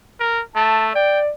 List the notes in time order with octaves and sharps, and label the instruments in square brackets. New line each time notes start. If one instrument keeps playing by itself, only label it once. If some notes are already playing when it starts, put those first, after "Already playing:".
[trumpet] A#4
[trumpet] A3 [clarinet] A5
[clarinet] D5 [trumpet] G5